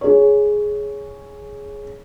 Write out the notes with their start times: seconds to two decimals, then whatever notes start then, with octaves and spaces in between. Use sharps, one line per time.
0.01 G#4 C#5